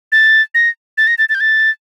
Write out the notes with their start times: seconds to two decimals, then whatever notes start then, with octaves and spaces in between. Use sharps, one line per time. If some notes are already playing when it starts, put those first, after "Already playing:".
0.12 A6
0.55 A#6
0.98 A6
1.07 A#6
1.18 A6
1.29 A6
1.35 G6
1.40 A6